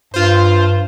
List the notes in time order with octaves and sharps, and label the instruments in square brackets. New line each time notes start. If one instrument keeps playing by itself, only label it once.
[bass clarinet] G2 [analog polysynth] F4 C5